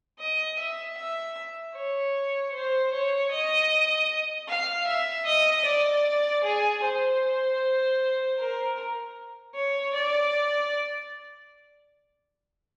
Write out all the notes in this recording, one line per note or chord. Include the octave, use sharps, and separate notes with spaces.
D#5
E5
E5
C#5
C5
C#5
D#5
F5
E5
D#5
D5
G#4
C5
A#4
C#5
D5